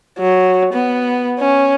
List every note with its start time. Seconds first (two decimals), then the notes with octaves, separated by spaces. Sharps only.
0.19 F#3
0.73 B3
1.39 C#4